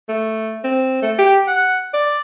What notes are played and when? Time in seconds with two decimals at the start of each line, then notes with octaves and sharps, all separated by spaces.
0.09 A3
0.64 C4
1.02 A3
1.19 G4
1.48 F#5
1.94 D5